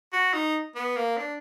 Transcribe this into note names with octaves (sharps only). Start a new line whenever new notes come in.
F#4
D#4
B3
A#3
D4